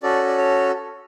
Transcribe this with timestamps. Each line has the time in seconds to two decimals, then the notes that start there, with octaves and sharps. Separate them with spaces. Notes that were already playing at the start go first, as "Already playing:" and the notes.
0.03 C#4 F#4 A4 D5
0.27 D5
0.38 C#5